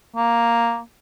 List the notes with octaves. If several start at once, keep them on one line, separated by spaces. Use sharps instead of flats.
A#3